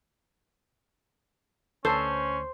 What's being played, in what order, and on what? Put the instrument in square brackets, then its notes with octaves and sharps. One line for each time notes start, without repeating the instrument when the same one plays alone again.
[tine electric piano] D2 [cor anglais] C#4 [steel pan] A4 [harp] C5